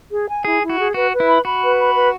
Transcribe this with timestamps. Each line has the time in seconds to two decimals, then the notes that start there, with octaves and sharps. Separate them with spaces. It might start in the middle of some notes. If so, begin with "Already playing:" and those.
0.11 G#4
0.28 G#5
0.45 E4 G#4
0.61 E4
0.70 F#4
0.78 G#4
0.94 F#4 B4
1.11 B4
1.20 E4
1.28 B5
1.45 F#4 B5
1.62 B4
1.79 B5
1.95 B4